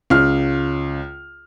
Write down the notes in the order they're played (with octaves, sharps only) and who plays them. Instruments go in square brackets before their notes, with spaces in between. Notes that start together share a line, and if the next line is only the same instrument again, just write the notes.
[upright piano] C#2 F6